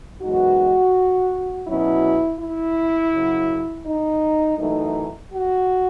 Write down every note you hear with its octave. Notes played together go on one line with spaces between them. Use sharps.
F#2 E3 G#3 B3 D#4 F#4
B2 F#3 C#4 E4
E4
F#2 C#3 F#3
D#4
F#2 E3 A3 D#4
F#4